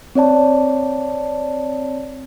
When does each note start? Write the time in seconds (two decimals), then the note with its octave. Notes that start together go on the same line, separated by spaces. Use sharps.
0.15 C4 C#5 D5 A5